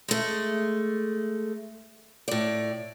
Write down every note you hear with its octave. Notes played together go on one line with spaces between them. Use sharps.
G#3 A3
A2 D5